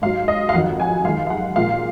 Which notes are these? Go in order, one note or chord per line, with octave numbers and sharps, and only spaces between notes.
G#2 F#3 F5
D#5
F5
F2 D#3 F#3 F#5
G#5
F#2 D#3 G#3 F5
F5
F#5
A#2 F3 G#3 F5